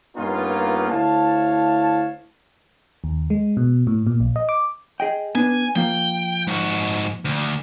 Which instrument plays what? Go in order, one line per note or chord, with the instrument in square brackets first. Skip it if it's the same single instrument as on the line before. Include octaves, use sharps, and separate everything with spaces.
[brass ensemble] G2 A#3 B3 C#4 D#4 F4
D2 E4 C#5 F5 A5
[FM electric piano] D#2
G#3
B2
A2
A#2
A#1
D#5
D6
[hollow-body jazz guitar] G#4 D#5 G5
[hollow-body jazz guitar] B3 D4 B4 [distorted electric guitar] G#5
[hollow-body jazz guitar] F3 A#3 F4 [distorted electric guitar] G5
[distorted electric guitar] G#2 F#4
D2